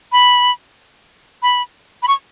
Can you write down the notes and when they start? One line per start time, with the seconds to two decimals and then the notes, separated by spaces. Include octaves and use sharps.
0.12 B5
1.43 B5
2.03 B5
2.08 C#6